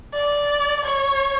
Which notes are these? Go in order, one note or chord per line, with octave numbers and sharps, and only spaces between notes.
D5
C#5